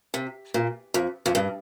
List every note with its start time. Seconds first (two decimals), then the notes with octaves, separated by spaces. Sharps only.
0.14 C3
0.54 A#2
0.94 F2
1.26 F2
1.35 G2